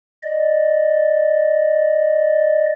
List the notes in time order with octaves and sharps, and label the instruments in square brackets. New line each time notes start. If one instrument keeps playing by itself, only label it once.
[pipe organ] D5 D#5